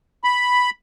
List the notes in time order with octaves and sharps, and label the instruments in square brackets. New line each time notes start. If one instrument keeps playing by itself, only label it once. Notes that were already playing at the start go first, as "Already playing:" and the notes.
[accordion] B5